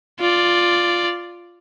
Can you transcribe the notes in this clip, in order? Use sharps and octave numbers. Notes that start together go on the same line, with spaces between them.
F4 D5